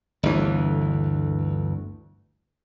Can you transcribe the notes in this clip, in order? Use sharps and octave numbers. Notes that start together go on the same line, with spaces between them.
G1 D2 E3